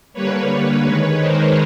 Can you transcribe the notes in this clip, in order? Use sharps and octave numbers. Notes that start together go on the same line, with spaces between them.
D3 G3 A#3 B4 C#5
D#3 G#3 B4 C#5
A#4 C5